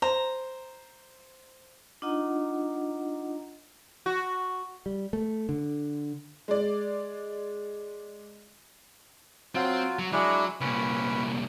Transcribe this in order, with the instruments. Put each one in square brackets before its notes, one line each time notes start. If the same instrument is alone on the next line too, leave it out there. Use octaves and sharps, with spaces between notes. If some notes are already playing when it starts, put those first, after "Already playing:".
[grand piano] C5 [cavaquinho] A#5
[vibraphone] D4 D#4 F4 D#5 F#5 A#5
[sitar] F#4
[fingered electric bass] G3
A3
D3
[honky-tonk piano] G#3 D5
[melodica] F#3 F4 [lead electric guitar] C4
[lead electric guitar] F#3
[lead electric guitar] F3 F#3 [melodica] G#3 D4 E4
[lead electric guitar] C2 A#2 [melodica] C#4 B4